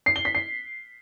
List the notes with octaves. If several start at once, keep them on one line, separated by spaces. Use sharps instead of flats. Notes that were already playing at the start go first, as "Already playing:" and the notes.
C7
G7
B6
C7